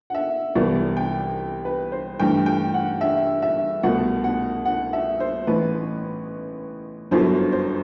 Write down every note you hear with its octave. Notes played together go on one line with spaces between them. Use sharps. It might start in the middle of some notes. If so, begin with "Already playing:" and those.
F#5
E5
C2 C3 E3 B3 D5
G5
B4
C5
G2 E3 A3 G5
G5
F#5
E5
E5
C2 B2 A3 F#5
F#5
F#5
E5
C5
A1 A2 E3 B4
G1 F#2 F#3 B3 E4 C5
C5